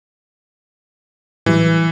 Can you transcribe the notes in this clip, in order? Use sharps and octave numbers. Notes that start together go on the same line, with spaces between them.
A2 E3 F#3 G3